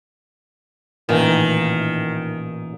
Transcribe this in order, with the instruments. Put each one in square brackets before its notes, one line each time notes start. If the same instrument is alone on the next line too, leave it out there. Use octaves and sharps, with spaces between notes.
[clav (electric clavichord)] A1 A#2 E3 [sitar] D#3